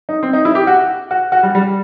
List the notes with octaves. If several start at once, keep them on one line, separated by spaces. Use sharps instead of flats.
D#4
C4
D#4
E4
G4
F#4
F#4
F#4
G3
G3